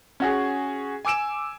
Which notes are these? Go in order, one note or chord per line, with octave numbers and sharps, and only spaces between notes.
C#4 F#4 G#4
G#5 D6 E6 D7 E7